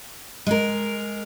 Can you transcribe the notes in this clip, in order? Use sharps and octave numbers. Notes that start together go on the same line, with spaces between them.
G#3 A#4